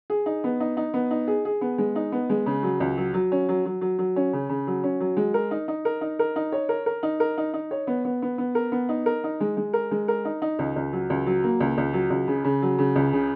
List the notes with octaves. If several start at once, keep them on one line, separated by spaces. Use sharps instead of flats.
G#4
D#4
B3
D#4
D#4
B3
D#4
G#4
G#4
B3
G#3
D#4
B3
G#3
C#3
F#3
C#2
F#3
F#3
C#4
F#3
F#3
F#3
F#3
C#4
C#3
C#3
F#3
C#4
F#3
G#3
A#4
D#4
D#4
A#4
D#4
A#4
D#4
C#5
A#4
A#4
D#4
A#4
D#4
D#4
C#5
B3
B3
B3
B3
A#4
B3
D#4
A#4
D#4
G#3
G#3
A#4
G#3
A#4
D#4
D#4
C#2
C#2
F#3
C#2
F#3
A#3
C#2
C#2
F#3
C#2
C#3
C#3
F#3
C#3
C#2
C#3